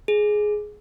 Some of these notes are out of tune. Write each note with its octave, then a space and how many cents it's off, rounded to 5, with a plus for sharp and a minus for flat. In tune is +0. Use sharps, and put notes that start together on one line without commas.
G#4 +10